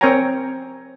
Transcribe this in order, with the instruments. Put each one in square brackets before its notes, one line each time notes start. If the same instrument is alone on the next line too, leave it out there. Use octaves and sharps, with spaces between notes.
[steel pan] C4 A#4 C#5 G5 G#5 A#5